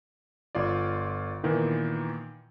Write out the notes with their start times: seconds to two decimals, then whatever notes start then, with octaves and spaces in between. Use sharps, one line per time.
0.55 G1 F4 D5
1.43 A#2 D#3 E3 B3